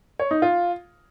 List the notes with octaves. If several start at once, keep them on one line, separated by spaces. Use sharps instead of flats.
C#5
D#4
F4